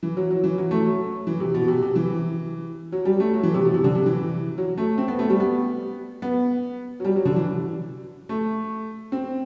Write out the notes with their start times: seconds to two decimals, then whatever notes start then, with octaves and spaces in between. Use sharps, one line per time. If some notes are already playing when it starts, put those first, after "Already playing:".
0.03 E3
0.17 F#3
0.30 F#3
0.44 E3
0.58 F#3
0.71 A3
0.86 F#3
1.27 E3
1.40 C3
1.54 B2
1.68 C3
1.82 C3
1.96 E3
2.92 F#3
3.05 G3
3.20 A3
3.34 F#3
3.43 E3
3.54 C3
3.65 B2
3.74 C3
3.84 D3
3.95 C3
4.06 E3
4.58 F#3
4.78 A3
4.98 C4
5.08 B3
5.19 A3
5.30 G3
5.40 B3
6.22 B3
7.00 F#3
7.05 G3
7.16 F#3
7.25 D3
7.36 E3
8.29 A3
9.12 C4